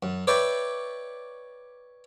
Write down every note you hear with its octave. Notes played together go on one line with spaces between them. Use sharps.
F#2
B4 C#5 D5 E5 G5